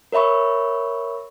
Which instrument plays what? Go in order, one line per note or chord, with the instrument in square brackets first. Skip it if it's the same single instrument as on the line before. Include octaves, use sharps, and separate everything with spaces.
[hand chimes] A#4 C#5 E5 B5 C#6